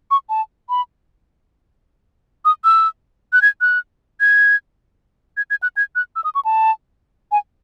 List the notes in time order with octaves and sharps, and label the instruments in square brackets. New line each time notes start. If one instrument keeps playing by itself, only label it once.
[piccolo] C#6
A5
B5
D#6
E6
F#6
G#6
F#6
G#6
G#6
G#6
F#6
G#6
F#6
E6
D#6
C#6
A5
G#5